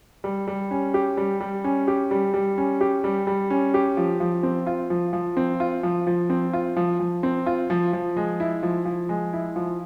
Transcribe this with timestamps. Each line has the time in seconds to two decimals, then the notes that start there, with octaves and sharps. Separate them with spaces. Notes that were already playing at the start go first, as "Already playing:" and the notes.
0.24 G3
0.48 G3
0.71 C#4
0.94 G4
1.17 G3
1.41 G3
1.64 C#4
1.88 G4
2.11 G3
2.34 G3
2.58 C#4
2.81 G4
3.04 G3
3.27 G3
3.50 C#4
3.74 G4
3.97 F3
4.20 F3
4.43 C4
4.67 F4
4.90 F3
5.13 F3
5.37 C4
5.60 F4
5.83 F3
6.07 F3
6.30 C4
6.53 F4
6.77 F3
7.00 F3
7.23 C4
7.46 F4
7.70 F3
7.93 F3
8.17 G#3
8.40 E4
8.63 F3
8.86 F3
9.09 G#3
9.33 E4
9.56 F3